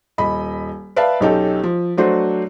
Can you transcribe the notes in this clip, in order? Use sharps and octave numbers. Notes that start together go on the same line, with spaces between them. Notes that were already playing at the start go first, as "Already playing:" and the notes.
D#1 D#5 B5
B4 D5 E5 F5 A5
B1 C#4 D#4 G4 A4
F3
F#3 A3 D4 F#4 C5